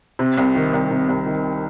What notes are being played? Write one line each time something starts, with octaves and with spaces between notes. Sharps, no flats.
C3
C2
D#3
C2
C3
C2
D#3